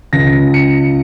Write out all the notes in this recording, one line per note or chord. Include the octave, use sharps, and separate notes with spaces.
C#2 C#3 A#6
C#7